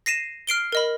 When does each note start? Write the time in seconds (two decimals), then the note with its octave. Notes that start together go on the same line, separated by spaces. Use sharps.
0.06 A#6 C7 D#7 E7
0.47 F6 C7 D7 G7
0.72 A#4 D#5 B5